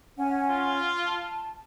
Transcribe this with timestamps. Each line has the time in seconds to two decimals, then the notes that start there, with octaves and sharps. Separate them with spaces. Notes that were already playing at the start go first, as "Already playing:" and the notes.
0.18 C#4 F#5 G#5
0.50 F4
1.06 A5